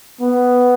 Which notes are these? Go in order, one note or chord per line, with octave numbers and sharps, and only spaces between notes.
B3